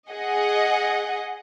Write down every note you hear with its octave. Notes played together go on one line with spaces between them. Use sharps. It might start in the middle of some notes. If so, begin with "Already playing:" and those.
G#4 D#5 F#5